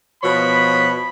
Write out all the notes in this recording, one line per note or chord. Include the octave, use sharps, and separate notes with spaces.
B2 F3 C#5 B5